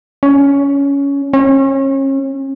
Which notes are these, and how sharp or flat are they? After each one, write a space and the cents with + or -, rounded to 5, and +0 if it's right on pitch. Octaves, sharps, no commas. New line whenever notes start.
C#4 +15
C#4 -35